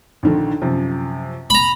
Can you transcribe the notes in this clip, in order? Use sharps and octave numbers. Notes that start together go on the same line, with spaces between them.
A#1 D3 D#3
F#2 C3 F3
A#5 B5